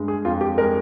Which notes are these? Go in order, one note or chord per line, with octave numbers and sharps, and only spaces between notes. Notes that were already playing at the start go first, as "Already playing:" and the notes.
Already playing: G2 G#3
G#4
F2 F4
G4
G#3 A#4